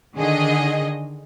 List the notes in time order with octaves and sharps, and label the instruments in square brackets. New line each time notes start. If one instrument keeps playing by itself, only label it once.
[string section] D3 D#3 G#4 D#5